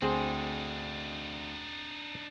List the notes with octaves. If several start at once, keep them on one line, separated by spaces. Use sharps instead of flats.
D2 C4 D4 D#4 G#4 C5